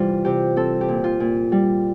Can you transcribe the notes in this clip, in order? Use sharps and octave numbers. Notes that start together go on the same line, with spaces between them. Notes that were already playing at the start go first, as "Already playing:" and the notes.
Already playing: C3 E3 G3 F4
C3 G4
C4 A4
G4
A#2
F4
A#2
G3